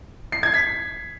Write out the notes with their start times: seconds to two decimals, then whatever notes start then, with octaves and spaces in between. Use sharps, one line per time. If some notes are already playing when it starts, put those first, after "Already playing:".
0.32 C7
0.43 G#6
0.54 B6